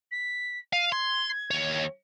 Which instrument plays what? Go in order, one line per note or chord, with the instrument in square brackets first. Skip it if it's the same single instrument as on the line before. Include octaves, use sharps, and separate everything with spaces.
[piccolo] B6
[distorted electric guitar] F5 [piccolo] D#7
[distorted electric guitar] C6 [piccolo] G#6
[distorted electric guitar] D#2 C#5